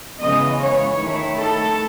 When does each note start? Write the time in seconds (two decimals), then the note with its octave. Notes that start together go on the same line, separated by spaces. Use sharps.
0.20 C#3 E3 G#3 B3 D#5
0.59 C#5
0.99 D#3 A3 E4
1.39 A4